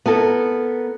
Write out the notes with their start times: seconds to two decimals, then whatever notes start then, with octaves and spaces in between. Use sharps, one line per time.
0.06 B3 E4 A4 A#4